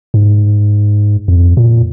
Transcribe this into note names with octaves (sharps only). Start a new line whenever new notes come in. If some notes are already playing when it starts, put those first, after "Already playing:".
G#2
F2
A#2